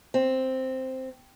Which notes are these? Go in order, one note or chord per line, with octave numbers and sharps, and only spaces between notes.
C4